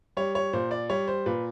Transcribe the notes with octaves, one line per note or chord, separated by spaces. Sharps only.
G3 C#5
C#5
A#2 C5
D5
G3 C#5
C5
A#2 B4